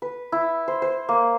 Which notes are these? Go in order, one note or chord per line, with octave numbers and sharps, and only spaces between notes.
B4
E4
C5
C5
A#3